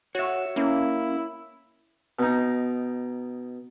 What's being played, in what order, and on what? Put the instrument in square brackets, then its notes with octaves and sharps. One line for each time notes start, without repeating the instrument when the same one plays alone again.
[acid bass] F#4 [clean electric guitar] C#5 E5
[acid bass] A#3 [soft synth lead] C#4 [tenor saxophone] E4
[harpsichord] B2 D#4